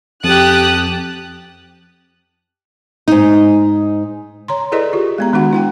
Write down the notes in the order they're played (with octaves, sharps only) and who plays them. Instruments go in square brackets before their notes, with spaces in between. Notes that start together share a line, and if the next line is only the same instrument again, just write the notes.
[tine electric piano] F2 [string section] G4 F#6 [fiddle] A5 D#6
[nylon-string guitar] G#2 D#4
[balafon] C#5 A#5 C6
E4 G#4 A4 B4 D5 D#5
F4 G4
G#3 B3 A#5
D#3 G#3 D4 F#4 F#5
E4 F#5 G5